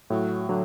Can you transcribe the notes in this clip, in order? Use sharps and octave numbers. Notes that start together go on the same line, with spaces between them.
A2 F#3
D3 F#3